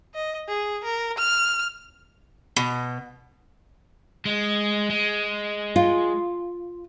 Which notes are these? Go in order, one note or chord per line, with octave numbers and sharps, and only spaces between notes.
D#5
G#4
A#4
F6
B2
G#3
G#3
F4